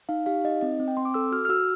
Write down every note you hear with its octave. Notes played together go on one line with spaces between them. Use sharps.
D#4 F5
G4 F5
D#4 D#5
C4 D#5
C4
G5
C4 C6
D6
A4 E6
F#4 F6
F6
F#4 E6